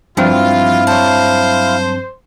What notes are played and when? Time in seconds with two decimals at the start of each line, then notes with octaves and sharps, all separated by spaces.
0.17 G2 F3 F#3 C4 E4 F4 F5
0.87 F#3 C5 A5